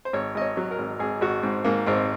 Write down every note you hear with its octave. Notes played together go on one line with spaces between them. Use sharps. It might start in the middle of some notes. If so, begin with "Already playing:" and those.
C5
G#1 C#5
G#1 D#5
C#5
F#3
A#4
G#1
G#1 G#4
G#1 F#4
G#2 C4
G#2 A#3
G#1 C4